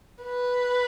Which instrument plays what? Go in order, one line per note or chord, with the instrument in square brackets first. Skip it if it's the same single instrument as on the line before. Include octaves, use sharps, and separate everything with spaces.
[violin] B4